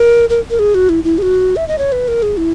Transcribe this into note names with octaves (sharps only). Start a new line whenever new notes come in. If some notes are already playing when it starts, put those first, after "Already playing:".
Already playing: A#4
A#4
A#4
G#4
F#4
E4
E4
G#4
F#4
E5
D#5
C#5
B4
A#4
G#4
E4